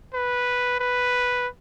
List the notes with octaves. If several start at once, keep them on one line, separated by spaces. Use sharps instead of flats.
B4
B4